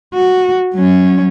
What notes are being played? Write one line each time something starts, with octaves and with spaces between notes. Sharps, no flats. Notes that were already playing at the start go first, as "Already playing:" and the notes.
F#4
F#3 C#4